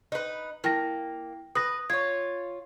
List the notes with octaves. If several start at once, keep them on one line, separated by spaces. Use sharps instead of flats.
D#4 B4
A#3 E4 G5 A#6
B4 D#6 A#6
F4 C#5 G#6